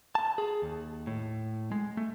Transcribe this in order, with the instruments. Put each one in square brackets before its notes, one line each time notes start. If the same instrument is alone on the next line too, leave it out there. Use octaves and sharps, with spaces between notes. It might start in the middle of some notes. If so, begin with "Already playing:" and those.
[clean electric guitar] A5
G#4
D#2
A2
G#3
A3